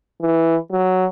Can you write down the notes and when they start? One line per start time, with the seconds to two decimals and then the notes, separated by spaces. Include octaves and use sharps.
0.22 E3
0.71 F#3